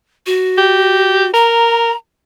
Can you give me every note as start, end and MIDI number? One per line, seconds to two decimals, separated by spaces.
0.27 1.31 66
0.58 1.26 67
1.34 1.91 70
1.34 1.96 82